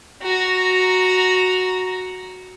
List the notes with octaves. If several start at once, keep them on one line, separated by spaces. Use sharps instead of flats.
F#4 A#5